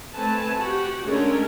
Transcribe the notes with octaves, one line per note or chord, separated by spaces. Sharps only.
A3 C4 B4 G#5 A5
F#4 G4
D3 G#3 A3 C#4 A#4